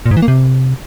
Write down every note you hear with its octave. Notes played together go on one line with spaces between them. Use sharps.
A#2
G#2
E3
A#3
C3